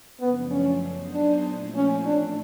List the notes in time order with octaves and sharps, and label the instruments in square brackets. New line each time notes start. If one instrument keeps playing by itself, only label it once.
[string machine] F#2 C#3 F3 A3 D4 [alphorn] B3
[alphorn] C#4
[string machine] F#3 B3 D#4 G#4 C5
[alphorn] D4
[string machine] A#2 F3 A3 C4 E4
[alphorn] C#4
[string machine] A2 E3 A3 [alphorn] D4